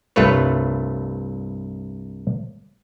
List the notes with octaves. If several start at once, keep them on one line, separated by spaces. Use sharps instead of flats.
C2 G2 A3 F4 B4 C#5